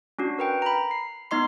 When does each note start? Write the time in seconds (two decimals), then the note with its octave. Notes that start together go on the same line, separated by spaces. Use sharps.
0.19 C#4 D4 F#4
0.39 A#4 B4 G5
0.62 A#5 B5
0.91 C7
1.31 B3 D#4 D#5 C6 C7